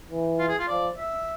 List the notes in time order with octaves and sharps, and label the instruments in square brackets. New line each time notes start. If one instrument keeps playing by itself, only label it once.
[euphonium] E3
[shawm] F4
G#4
F4
[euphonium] F3 [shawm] D5
[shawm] E5